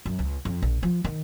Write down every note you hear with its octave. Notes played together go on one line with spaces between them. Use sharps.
F#2
C#2
F2
A#1
F3
D#3